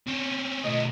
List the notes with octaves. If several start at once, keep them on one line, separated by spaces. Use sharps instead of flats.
C4 C#4
B1 A3 D#5